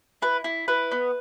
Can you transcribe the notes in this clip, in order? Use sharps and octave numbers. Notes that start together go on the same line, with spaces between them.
E4 B4
E4
E4 B4
B3